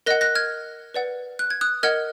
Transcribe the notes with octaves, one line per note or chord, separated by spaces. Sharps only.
A#4 D#5 F#5 F#6 A#6
F#6 A#6
F6 G#6
B4 D5 F#5
F#6
G#6
D#6 F#6
A#4 D#5 F#5 F6 G#6